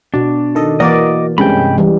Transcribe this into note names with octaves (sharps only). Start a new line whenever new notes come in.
B2 D4 F#4
D#3 A4 D#5
E3 A#3 F#4 A#4 D5 D#5 D6
G2 C3 G#3 C#4 G5 B5
E3 G3